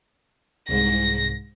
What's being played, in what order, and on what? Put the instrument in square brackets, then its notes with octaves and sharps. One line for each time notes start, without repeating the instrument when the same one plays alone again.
[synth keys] C2 G#2 [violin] A#6